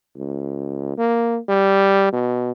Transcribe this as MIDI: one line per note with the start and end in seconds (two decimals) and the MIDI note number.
0.17 0.94 37
0.98 1.39 58
1.49 2.09 55
2.13 2.52 47